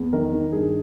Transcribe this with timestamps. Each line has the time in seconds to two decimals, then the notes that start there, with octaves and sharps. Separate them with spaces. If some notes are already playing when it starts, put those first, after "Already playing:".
Already playing: E2
0.13 D#3 A#4
0.33 D#3
0.52 G2 G#4